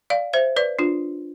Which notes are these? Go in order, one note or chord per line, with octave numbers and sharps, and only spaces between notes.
D5 F5
C5 E5
B4 D5
D4 F4